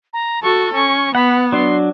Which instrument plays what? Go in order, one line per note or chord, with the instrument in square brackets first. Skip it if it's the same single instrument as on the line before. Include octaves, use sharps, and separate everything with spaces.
[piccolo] A#5
[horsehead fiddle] F#4 A4 [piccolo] C#6
[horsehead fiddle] C#4 [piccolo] C#6
[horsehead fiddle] B3 [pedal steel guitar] F#5 [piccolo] B5
[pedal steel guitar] F#3 D4 [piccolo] C6